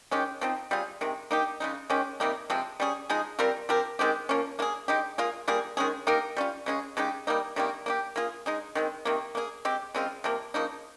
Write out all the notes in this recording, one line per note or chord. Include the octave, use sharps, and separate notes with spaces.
D#3 G#3 C#4 G4
F3 C4 D#4
G3 C4 F4 G#4
C3 D#3 G#3
A#3 D#4 G4
C#3 G#3 D#4
D#3 G#3 C#4 G4
C3 G3 A#3 D#4
C3 F3 G#3 C4
G3 C#4 G#4
F3 G#3 D#4 G#4
G3 C4 F4 A#4
F3 C4 G4 A#4
D#3 G#3 C4 G4
F3 A#3 C#4
A#3 F4 G#4
G#3 D#4 G4
A#3 F4 G#4
G3 A#3 F4 G#4
D#3 G#3 C#4 G#4
A#3 D#4 G4 A#4
G3 C#4 F4
C#3 G#3 C#4 G#4
C#3 G#3 D#4 G4
G3 A#3 D#4
C3 D#3 G3 A#3
A#3 D#4 G4
A#3 F4 G#4
G#3 D#4 G#4
D#3 G#3 C4
C3 D#3 A#3
A#3 D#4 G#4
G#3 C4 G4
C#3 G#3 C4 F4
C3 F3 A#3
C#3 F3 A#3 D#4